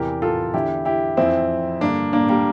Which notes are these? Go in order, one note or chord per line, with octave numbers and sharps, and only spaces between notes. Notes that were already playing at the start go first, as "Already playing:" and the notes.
Already playing: E2 C3 E3 G4 A#4
F4 A4
E2 D3 E4 G4
E4 G4
F2 E3 C4 E4
G2 D3 A#3 D4
A#3 D4
G3 A#3